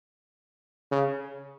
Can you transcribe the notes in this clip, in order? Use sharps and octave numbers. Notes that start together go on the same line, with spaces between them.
C#3